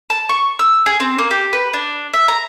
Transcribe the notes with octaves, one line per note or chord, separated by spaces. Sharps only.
A5
C#6
E6
G#4
C4
A#3
G4
B4
D4
E5
A#5